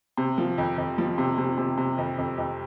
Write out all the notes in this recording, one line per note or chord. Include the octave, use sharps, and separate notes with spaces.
C3
F3
F2
F2
F3
C3
C3
C3
C3
F2
F2
F2